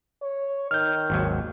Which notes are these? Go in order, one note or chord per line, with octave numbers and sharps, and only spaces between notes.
C#5
D#3 F6 G6
G#1 D#2 F#3